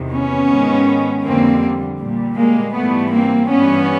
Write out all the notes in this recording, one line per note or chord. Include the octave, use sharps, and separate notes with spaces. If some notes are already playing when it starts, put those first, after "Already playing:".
Already playing: E2 C3 D#3
B3 C#4
G#2 D#3 G#3
F2 D3 G3 A#3 C4
A#2 G3
G#3 A#3
G#2 E3 G3 A3 B3
A#3 C4
G2 E3 G3 B3 C#4